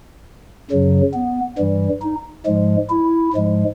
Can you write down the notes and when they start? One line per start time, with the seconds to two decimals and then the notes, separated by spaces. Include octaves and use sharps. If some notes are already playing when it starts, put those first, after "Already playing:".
0.71 F#2 C#3 F#3
1.14 B3
1.58 G2 E3 G3
2.02 D#4
2.46 G#2 F3 G#3
2.90 E4
3.33 G#2 F3 G#3